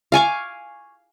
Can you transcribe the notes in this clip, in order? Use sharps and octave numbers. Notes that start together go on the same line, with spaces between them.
F5 G#5 C#6 D6